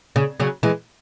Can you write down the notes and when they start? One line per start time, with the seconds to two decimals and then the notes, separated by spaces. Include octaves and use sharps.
0.16 C#3
0.40 C#3 F#3
0.63 E3 G#3